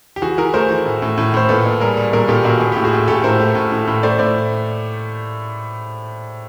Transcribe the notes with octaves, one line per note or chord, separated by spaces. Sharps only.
G4
E3 F#4 G#4
E3 G#4 A#4
A3 A#4 C5
E3
A2
A2
A2
A2 C5
A#2 A4 B4
A#2
G3 G#4 A#4
G3
A#2 G#4 A#4
A#2 G4 A4
A#2 F#4 G#4
A#2 G#4
A2 G4
F#4 G#4
A2
A2 G4 A4
A2 A#4 C5
A3
A2
A2
A2
A3 C5 D5
A2 C5 D5